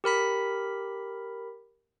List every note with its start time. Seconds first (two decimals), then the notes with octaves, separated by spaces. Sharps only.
0.04 G4 A#4 B5 B6